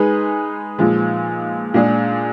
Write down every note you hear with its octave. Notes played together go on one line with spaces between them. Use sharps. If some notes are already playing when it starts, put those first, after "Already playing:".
Already playing: G#3 D#4 G#4 B4
A#2 F3 G#3
A#2 G#3 D4 G#4